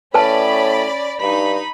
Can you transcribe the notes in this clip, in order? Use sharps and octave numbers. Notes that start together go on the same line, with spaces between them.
A2 C#4 B4 D5 A5 B5
G2 D#4 B5